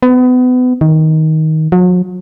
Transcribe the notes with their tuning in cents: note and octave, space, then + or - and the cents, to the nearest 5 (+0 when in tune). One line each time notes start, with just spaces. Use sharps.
B3 +30
D#3 +15
F#3 -40